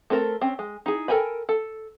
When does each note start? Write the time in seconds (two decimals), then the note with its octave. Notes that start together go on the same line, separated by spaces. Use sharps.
0.10 A3 C4 A4 A#4
0.41 C4 C#4
0.59 G#3
0.86 D#4 E4 G#4
1.08 A4 A#4 G5 G#5 B5
1.49 A4